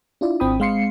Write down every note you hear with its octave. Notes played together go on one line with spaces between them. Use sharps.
D4 E4 F4 D5
G#1 C4 G5 B5 D#6
G#3 C4 F5 C6 C7 C#7